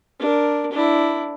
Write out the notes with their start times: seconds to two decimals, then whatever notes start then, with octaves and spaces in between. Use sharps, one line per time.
0.20 D4 A#4
0.72 D4 E4